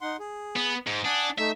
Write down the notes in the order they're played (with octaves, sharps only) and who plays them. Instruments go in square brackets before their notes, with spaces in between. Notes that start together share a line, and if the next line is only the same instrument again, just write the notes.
[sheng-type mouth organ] D#4 F#5 C6
G#4
[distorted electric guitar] B3
G#2
[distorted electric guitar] D4 [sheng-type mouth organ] F#5 G#5 D#6
[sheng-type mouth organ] A3 D#4 [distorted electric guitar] E5